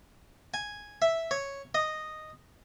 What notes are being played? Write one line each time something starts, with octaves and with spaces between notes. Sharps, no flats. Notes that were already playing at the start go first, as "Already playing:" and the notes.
G#5
E5
C#5
D#5